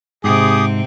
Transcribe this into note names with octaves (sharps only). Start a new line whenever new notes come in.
G#2 C3 C4 G4 G#4 D#6